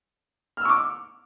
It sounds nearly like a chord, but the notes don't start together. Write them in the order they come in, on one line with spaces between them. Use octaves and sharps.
F6 E6 C#6 D6